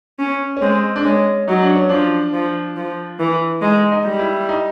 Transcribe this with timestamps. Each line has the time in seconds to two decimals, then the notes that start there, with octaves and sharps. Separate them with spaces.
0.19 C#4
0.57 C#4
0.62 G#3 C4
0.96 D4
1.04 G#3 C#4
1.48 F#3 D#4
1.62 D4
1.75 C#4
1.89 F3 D4
2.33 F3
2.77 F3
3.20 E3
3.62 G#3 D#4
3.92 D#4
4.06 G3
4.19 E4
4.49 D#4